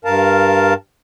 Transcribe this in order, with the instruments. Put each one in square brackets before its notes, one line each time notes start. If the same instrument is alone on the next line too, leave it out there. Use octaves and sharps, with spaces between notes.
[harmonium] G2 A#4 F5 A5